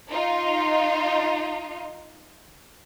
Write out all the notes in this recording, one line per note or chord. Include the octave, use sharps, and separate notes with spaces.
D#4 F4